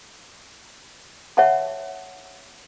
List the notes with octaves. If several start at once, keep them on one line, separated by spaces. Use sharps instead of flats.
C#5 E5 F#5 A5 B5